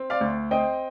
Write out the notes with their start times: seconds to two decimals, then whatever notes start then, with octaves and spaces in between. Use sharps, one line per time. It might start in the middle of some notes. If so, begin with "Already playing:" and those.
Already playing: C4
0.10 D5 F5
0.21 D2
0.51 C4 D#5 G5